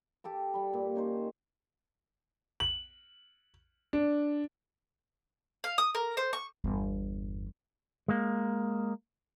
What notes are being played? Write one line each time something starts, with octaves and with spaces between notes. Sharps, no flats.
G4 A4 D6
G3 B5
A#2
C#4 D#4 C5
F#7
D4
F5
D#6
A#4
C5
C#6
G1 E2
G#3 A#3